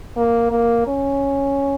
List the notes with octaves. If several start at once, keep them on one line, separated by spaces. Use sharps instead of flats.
A#3
A#3
C#4